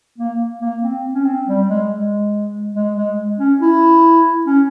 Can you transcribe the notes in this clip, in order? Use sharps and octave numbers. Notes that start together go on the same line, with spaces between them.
A#3
A#3
C4
C#4
C4
G3
G#3
G#3
G#3
G#3
C#4
E4
C#4